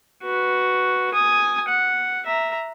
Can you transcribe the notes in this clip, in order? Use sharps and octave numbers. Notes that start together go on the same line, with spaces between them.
F#4 B4
G#5 D#6
F#5
E5 A#5